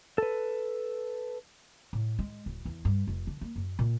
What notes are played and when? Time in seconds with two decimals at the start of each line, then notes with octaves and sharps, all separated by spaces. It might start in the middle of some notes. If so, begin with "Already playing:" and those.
0.18 A4 B4
1.93 A2
2.19 G#3
2.46 D1
2.65 E2
2.85 G2
3.07 F1
3.27 D3
3.41 A#3
3.56 F#2
3.79 A#2